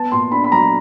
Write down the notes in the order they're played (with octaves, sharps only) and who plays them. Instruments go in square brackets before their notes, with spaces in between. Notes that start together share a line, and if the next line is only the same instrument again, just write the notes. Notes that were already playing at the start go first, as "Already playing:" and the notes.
Already playing: [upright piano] B3 [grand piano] A5
[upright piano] A#2 [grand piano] C6
[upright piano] D4 [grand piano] B5
[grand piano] B5
[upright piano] F#3 [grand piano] A#5